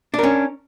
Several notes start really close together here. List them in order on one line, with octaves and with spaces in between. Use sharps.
D4 A#4 C#4